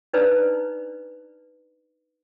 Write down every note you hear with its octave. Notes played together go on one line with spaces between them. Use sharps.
D4 D#4 B4 C5 D5 A#5